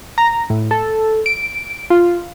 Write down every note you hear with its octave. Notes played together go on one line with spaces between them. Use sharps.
A#5
A2
A4
D7
F4